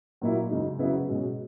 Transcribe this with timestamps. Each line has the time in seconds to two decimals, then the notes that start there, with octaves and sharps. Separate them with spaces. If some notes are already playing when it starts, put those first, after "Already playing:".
0.21 A#2 F#3 A#3 E4
0.50 F#2 C#3 G#3 D#4
0.79 C#3 F#3 B3 E4 B4
1.07 B2 G#3 C#4 G#4